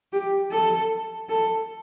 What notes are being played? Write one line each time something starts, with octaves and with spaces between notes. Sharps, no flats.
G4
A4
A4